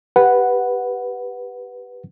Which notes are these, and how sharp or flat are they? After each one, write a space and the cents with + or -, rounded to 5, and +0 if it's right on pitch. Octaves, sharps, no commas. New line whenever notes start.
G4 +0 B4 +0 F#5 +0